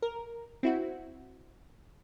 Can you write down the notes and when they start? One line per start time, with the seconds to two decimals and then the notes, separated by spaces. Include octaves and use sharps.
0.02 A#4
0.63 C4 E4 F#4